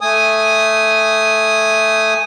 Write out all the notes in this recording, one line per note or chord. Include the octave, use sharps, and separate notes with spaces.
A3 G#5 D#6